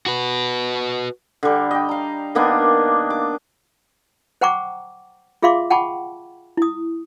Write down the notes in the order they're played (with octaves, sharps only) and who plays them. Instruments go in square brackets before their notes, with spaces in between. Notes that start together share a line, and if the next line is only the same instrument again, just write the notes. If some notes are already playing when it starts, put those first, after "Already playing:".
[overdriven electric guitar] F#4 B4
[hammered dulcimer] D3 G3
D#5 G5
F5 A#5
D#3 A#3 B3 D4
D6
[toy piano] C5 F#5 G5 A#5 C#6 D6
F4 G#4 E5 F5 C6 D6
F#5 G5 A5 B5 C#6 D6
E4 D#6